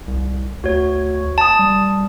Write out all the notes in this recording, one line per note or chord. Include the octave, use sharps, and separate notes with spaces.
C2
D2 F#4 C#5
A5 D#6
G3